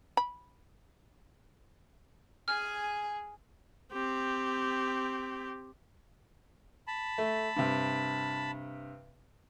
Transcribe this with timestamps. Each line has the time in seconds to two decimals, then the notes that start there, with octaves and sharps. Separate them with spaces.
0.17 B5
2.48 G#4 G#5 F6
3.93 C4 G4
6.87 A5 B5
7.18 A3
7.56 G2 C3